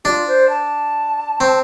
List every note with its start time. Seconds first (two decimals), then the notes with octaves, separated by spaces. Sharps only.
0.04 D4 F4 G4
0.28 C5
0.49 A5
1.40 C4